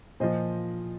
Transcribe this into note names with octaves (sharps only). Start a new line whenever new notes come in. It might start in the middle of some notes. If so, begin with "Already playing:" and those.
A#2 F3 C5 D#5